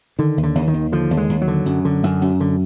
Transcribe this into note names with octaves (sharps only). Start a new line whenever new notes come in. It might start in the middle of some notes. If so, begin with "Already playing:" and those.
D3 D#3
D#2
D3
D#2
D#3
D#2
D3 F3
D#2
G#3
D#2
F#3
D3
F#2
D3
F#2
F#2
D3